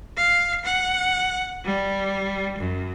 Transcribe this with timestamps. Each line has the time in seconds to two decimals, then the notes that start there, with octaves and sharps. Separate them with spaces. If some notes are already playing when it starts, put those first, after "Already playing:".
0.17 F5
0.65 F#5
1.65 G3
2.58 F#2